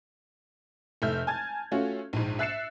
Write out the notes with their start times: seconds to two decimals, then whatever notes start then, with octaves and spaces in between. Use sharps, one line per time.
1.02 F1 A3 E5 F6 G6
1.27 G#5 A5 G#6 A6
1.72 A3 C#4 F4 F#4
2.13 A#1 G#2
2.39 E5 F#6 A6 C7 C#7 E7